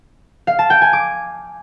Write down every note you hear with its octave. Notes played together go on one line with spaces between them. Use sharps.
F5
A5
G5
G#5
D6